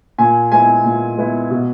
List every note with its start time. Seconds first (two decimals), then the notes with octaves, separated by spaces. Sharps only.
0.18 A#2 G#5
0.52 G#3 B3 E4 G#5
0.84 A#2
1.18 G#3 B3 E4
1.50 B2